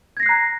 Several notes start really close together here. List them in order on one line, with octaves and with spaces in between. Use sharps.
G#6 A#6 C7 F#6 A#5